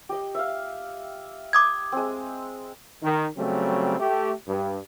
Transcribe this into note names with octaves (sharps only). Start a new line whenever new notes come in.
G4 D#5
E5 F5
D6 D#6 G#6
G#3 C4
D#3
C#3 F#3 G3 A3 C4
A3 G4
G2